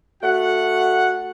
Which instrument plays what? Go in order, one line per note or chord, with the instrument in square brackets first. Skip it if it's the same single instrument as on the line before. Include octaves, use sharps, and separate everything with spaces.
[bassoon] A3 [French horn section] F#4 [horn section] F#5